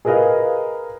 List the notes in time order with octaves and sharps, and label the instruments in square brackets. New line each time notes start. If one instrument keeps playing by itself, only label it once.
[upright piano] G#4 A#4 B4 D#5 F5